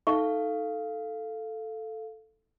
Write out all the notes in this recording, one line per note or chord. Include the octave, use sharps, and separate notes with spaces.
D#4 A4 E5 F5 C#6